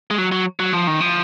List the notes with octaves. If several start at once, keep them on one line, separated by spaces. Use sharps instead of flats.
G#3
F#3
F#3
F#3
F3
D#3
F3